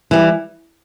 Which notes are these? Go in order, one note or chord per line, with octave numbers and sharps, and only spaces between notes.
E3 G3